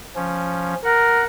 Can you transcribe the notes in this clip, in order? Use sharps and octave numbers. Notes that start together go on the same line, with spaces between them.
F3 C#4
A#4 F#5